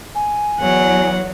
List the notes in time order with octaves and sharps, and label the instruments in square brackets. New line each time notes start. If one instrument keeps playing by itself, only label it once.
[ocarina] G#5
[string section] E2 F#3 [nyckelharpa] C#5 F#5